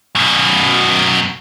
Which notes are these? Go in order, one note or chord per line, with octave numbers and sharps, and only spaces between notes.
F#2 B2